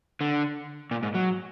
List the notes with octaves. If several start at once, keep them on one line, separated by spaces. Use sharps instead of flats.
D3
A#2
G#2
F#3